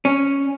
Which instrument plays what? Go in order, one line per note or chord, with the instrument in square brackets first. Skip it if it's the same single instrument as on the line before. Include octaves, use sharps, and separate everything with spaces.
[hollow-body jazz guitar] C#4